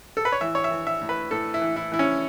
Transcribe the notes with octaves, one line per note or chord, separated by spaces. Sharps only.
A4
B4
C#5
E3 E5
C#5
E5
E3
E5
A2
B4
A2 A4
E4
E3
E4
E3 E4
C#4